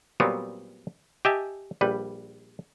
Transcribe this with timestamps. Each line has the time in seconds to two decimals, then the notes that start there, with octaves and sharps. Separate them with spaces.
0.20 A#2 F#3 G3 B3 C4
1.25 G4 D#5 E5 G#5 A5
1.81 A#1 G3 B4